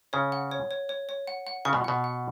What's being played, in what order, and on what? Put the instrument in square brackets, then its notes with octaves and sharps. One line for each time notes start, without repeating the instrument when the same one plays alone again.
[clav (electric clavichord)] C#3 [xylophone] C#5
[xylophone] F#5
C#5
C#5
C#5
C#5
F#5
F#5
[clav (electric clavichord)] C#3 [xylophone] C#6
[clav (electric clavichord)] B2
[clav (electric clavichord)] B2 [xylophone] F#5
[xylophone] F#5